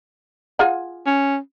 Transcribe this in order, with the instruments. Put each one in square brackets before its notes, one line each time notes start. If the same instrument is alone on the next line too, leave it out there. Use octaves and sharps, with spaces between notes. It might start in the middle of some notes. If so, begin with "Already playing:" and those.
[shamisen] F4 G#4 F#5
[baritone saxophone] C#4